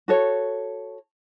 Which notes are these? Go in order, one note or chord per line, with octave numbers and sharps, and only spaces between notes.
F#4 A4 C#5